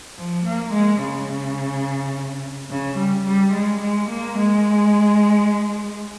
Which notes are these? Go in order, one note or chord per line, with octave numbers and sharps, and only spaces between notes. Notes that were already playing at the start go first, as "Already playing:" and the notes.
F3
A#3
G#3
C#3
C#3
G3
G3
G#3
G#3
A#3
G#3